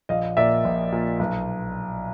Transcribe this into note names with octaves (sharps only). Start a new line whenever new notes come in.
A#1 D#5 F5
A#2 D5 E5
A#1
A#2
B1